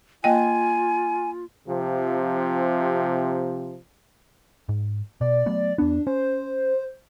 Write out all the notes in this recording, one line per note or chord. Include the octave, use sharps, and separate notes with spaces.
A#3 F4 D#5 G5 G#5
C3 F3
G#2
B2 D5
F#3 A3 B3
E2 B3 D4
C#4 C5